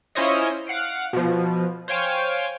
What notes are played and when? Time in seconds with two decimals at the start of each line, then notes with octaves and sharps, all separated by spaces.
0.15 C#4 E4 F4 C5 C#5 D#5
0.67 F5 F#5 C7 D7
1.13 B2 F3
1.88 C5 C#5 F5 G5 G#5